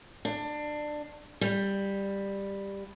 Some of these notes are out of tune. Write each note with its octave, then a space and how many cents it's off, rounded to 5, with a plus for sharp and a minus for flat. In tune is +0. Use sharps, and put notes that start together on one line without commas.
D4 +20
G3 +10